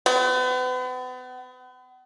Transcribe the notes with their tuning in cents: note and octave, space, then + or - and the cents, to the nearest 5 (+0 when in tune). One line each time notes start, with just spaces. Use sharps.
B3 +40